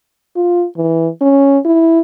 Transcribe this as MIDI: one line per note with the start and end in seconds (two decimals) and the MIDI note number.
0.36 0.65 65
0.77 1.08 52
1.21 1.59 61
1.65 2.00 64